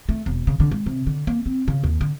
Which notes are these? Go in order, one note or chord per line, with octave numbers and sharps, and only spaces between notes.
A3
E1
C#3
D3
G#3
C3
D3
A#3
C4
C#3
D#2
D3